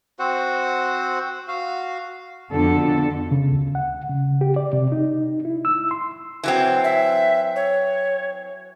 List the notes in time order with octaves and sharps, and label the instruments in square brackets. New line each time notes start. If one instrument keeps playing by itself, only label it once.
[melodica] C4 F#4 C5 F#5
F#4 F5
[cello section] F2 B2 D3 A4
[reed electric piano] C#3
D2
F#5
C#3
G4
D5
C3
D#4
E4
E6
C6
[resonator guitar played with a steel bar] E3 F#3 C4
[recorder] E5
C#5